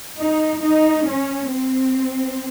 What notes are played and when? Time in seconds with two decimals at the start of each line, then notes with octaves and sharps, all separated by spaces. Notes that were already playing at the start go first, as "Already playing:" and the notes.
0.19 D#4
0.62 D#4
1.07 C#4
1.50 C4